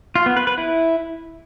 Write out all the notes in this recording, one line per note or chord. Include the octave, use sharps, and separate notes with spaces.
F4
B3
B4
B4
E4